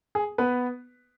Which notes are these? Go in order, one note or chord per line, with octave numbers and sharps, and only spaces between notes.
G#4
B3 B4